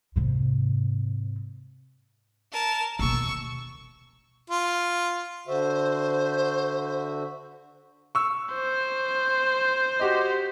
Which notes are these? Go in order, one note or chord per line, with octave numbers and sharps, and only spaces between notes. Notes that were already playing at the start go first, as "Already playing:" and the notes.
G#2 C3
A#4 A5
D#2 B2 C#6 E6
F4
D3 F#4 C5 E5
C#6 E6
C5
F#4 G4 D#5